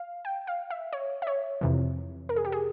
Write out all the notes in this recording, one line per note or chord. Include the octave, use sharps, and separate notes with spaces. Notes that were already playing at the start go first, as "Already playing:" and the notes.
Already playing: F5
G5
F5
E5
C#5
E5
C#5
F2 C3 E3
A#4
G#4
G4
G#4